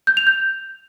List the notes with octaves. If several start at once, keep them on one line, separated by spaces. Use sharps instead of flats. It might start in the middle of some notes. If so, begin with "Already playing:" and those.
G6
F7
G6